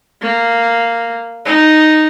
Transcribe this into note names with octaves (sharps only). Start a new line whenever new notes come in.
A#3
D#4